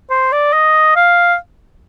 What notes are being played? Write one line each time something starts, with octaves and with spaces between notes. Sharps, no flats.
C5
D5
D#5
F5